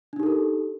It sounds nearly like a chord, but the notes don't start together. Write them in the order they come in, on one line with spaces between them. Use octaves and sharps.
D4 D#4 G4 A4 A#4